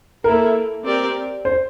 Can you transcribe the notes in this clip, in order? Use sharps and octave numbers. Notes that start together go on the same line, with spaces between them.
A#3 E4 A4 A#4
C4 G4 A#4 D5
C5